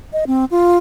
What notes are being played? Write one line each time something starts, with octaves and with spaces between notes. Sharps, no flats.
D#5
C4
F4